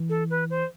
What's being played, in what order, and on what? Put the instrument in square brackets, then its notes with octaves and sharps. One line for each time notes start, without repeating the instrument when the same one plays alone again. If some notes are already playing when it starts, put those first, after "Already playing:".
Already playing: [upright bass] E3
[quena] A4
B4
C5